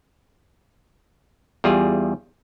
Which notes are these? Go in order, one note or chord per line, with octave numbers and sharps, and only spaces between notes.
E2 G3 F4 G#4